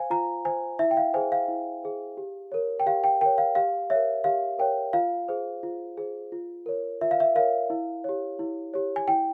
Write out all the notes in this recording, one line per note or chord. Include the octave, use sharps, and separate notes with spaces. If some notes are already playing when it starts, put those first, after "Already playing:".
Already playing: C5 F5 G#5
F4 A#5
C5 G#5
E4 E5
G5
F5
G#4 C5 G#5
F5
E4
G#4 C5
G4
A#4 C#5
G5
G4 F5
G5
A#4 C#5 G5
F5
G4 F5
A#4 C#5 E5
G4 F5
A#4 C#5 G5
F4 F5
G#4 C5
F4
G#4 C5
F4
A#4 C#5
F4 E5
F5
E5
A#4 C#5 F5
E4
G4 C#5
E4
G4 C#5
G#5
E4 G5